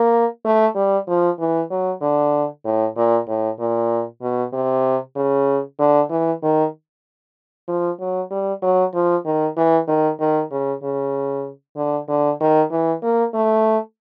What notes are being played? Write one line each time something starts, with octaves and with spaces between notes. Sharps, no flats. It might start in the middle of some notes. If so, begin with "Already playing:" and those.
Already playing: A#3
A3
G3
F3
E3
F#3
D3
A2
A#2
A2
A#2
B2
C3
C#3
D3
E3
D#3
F3
F#3
G3
F#3
F3
D#3
E3
D#3
D#3
C#3
C#3
D3
D3
D#3
E3
A#3
A3